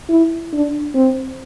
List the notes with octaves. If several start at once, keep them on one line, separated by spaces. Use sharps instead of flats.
E4
D4
C4